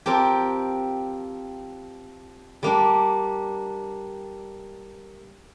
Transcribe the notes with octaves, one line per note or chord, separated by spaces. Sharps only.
F3 C4 G4 A#4
G3 A#3 D4